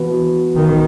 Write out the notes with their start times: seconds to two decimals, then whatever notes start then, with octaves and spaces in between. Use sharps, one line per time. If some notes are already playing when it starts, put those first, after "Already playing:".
Already playing: E3 B3 F#4 B4
0.56 D#3